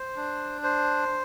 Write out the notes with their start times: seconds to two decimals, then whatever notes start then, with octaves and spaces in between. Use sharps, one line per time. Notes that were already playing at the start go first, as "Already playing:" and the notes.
Already playing: C5
0.16 D4
0.64 C5